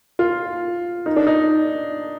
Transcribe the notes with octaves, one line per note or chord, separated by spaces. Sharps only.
F4
D#4
D4
D#4